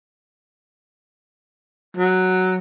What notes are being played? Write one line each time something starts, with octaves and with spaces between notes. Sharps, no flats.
F#3